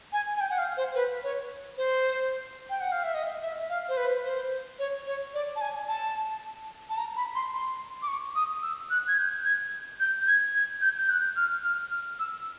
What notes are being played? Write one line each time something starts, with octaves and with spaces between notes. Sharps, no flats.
G#5
G#5
G5
F#5
F5
C5
B4
C#5
C5
G5
F#5
F5
E5
D#5
E5
F5
C5
B4
C5
C#5
C#5
D5
A5
G#5
A5
A5
A#5
B5
C6
C6
D6
C#6
D#6
E6
F#6
G#6
G6
G#6
G6
G#6
G#6
G6
G6
F#6
F6
F6
F6
E6